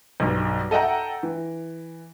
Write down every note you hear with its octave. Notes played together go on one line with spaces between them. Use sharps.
B1 G2
A4 D#5 E5 F#5 G5 A#5
E3